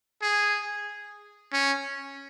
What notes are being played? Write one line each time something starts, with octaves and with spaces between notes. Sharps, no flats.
G#4
C#4